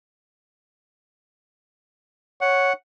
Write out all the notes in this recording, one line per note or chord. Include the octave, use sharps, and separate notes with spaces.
C#5 F#5